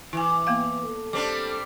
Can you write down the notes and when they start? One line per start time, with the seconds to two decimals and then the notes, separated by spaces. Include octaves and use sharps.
0.13 E3 E4 G#5
0.47 A#3 B3 F5
0.84 A4
1.13 G3 C4 D4 D6